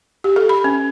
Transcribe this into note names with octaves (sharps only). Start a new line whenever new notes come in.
G4
A4
B5
C#4